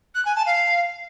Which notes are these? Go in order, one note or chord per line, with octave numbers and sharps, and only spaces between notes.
F#6
G#5
A5
F5